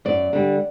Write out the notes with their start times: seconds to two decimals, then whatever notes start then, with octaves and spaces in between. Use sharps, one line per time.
0.05 F#2 D5
0.33 D3 G3